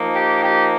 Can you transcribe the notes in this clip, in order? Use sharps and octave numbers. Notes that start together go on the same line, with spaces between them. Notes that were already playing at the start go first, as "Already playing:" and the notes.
Already playing: F3 A#3 D#4
G4
G4